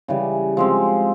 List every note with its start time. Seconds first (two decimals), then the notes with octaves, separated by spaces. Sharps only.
0.08 C#3 E3 G3
0.57 F3 G#3 C4